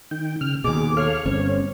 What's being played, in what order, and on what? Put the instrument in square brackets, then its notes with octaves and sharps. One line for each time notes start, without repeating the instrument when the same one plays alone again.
[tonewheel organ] D#3 G5
C#3 F6
[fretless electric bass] D#2 B2 [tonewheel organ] G#4 [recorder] D6
[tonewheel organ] A4 F5 F6 [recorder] C#5
[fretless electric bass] G1 [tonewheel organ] C4 C#4